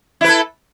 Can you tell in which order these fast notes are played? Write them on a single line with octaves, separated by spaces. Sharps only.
E4 B4 A4